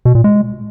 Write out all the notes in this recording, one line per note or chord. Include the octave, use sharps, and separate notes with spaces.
B2
A#2
G#3